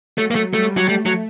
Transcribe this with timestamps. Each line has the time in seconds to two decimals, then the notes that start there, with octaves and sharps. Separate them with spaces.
0.18 F#3 A3
0.31 A#3
0.35 A3
0.53 G3 A3
0.77 F#3
0.88 G3 A3
1.06 F#3